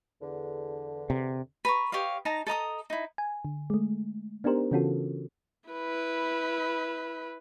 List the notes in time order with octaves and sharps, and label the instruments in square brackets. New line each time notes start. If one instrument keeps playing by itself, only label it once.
[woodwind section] E2 D3
[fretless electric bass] C3
[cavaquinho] B4 A#5 C#6
G4 C#5 D#5 F5
D#4 A5 A#5
A4 D#5 A#5 D#6
D#4 E4
[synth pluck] G#5
D3
G#3 A3
B3 D4 D#4 G4 A#4 C5
C#3 E3 C#4 F4 F#4 A4
[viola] E4 B4